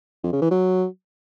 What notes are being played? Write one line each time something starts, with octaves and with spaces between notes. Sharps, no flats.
F2
C#3
E3
F#3